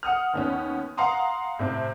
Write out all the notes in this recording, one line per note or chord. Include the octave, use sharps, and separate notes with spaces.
F#5 D#6 F6
D#2 B3 C#4
F5 F#5 A#5 C6 D#6
A2 C3 C4